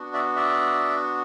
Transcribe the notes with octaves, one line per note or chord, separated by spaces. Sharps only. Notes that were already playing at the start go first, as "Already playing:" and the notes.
Already playing: B3 D4 F#4
D5 E5
D5 E5